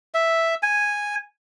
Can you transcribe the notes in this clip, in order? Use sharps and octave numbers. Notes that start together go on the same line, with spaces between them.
E5
G#5